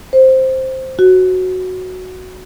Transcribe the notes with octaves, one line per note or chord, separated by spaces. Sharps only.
C5
F#4